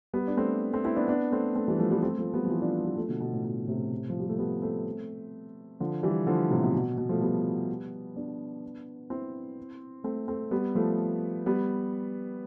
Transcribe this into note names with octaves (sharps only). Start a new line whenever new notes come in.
G3 B3
D4
A3 C4
A3 C4
C4 E4
B3 D4
B3 D4
A3 C4
A3 C4
E3 G3
F3 A3
G3 B3
A3 C4
F3 A3
G3 B3
F3
E3 G3
D4 F4
G3 B3
F3 A3
B2 D3
B2
A2
B2
A2 C3
F3
G3
A3
G3 B3
A3 C4
D3 F3
E3 G3
D3 F3
A2 C3
B2
B2
B2
F3 A3
G3 B3
B3 D4
C4 E4
A3 C4
A3 C4
G3 B3
F3 A3
G3 B3